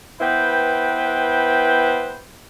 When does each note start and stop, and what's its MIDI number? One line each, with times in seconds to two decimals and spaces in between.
0.21 2.20 59
0.21 2.20 64
0.21 2.20 71
0.21 2.20 72
0.21 2.20 79